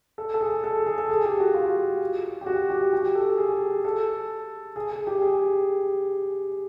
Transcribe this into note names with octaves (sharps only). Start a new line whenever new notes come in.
A4
A4
G#4
A4
G#4
A4
G#4
G4
F#4
F4
G4
F#4
G4
G4
A4
G#4
A4
G#4
G#4
G4
G#4